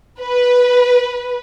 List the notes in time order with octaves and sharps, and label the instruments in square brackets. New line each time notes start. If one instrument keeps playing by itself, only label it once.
[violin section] B4